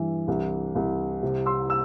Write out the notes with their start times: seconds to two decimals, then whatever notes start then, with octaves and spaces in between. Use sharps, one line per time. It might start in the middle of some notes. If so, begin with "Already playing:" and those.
Already playing: G2 E3
0.28 C2
0.75 C2
1.23 C3
1.46 C6 E6
1.70 E6